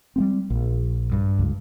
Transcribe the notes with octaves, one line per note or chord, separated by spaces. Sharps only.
G3 A#3 C4
A#1
G2
C#2